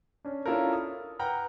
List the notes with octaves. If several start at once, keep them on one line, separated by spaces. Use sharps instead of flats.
C#4 D4
C#4 D4 E4 F4 A4 A#4
D#6
B4 F#5 G5 A#5 F6